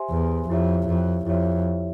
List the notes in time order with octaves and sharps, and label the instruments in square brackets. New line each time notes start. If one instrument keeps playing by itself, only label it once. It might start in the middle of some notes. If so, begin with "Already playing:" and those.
Already playing: [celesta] G4 C5 E5 G#5 C6
[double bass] E2
[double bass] F2 [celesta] E4 G4 C#5 E5
[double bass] F2
[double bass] F2 [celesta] E4 G4 C#5 E5